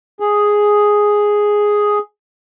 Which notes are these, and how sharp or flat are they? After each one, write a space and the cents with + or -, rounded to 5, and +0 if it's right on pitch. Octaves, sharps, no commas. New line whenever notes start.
G#4 +0